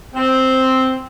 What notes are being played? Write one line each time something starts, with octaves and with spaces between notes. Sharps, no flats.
C4